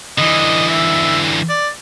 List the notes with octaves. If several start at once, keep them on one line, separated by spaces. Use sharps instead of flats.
D3 E3 D#5
E5
D5